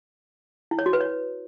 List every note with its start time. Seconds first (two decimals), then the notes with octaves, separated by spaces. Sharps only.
0.71 E4
0.79 C#5
0.86 F#4
0.93 B4
1.01 C#5